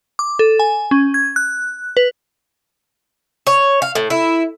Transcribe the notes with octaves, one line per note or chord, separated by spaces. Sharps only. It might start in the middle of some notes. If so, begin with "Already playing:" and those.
D6
A4
G#5
C#4
G#6
F#6
B4
C#5
F5
A2
E4